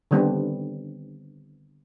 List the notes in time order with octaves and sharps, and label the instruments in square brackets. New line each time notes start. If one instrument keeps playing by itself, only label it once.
[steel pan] D3 D#3 G3 B3 C4 D4